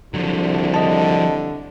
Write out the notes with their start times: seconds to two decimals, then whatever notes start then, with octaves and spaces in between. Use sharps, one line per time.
0.14 C2 D3 F3 F#3
0.74 D3 D#5 A5